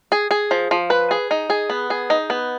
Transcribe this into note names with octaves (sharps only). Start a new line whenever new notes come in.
G#4
G#4
F3
F3
B4
G#4
D#4
G#4
B3
G#4
D#4
B3